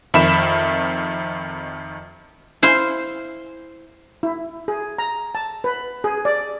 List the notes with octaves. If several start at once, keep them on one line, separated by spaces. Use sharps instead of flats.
F2 D#3 E5 B5 E7
E4 C5 F5 C6
E4
G#4
A#5
A5
B4
G#4
D5